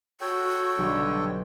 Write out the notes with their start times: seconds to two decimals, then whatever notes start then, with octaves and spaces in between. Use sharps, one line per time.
0.21 F#4 A4 C#5 G5
0.78 B1 D3 G3